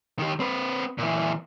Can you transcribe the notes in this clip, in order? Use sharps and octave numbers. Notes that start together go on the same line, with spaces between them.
D#3 G4
C4 B4
A#2 E3